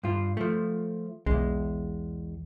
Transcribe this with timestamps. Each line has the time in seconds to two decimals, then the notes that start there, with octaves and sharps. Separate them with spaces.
0.03 G2 F4
0.37 F3 A3
1.26 B1 E2 G#3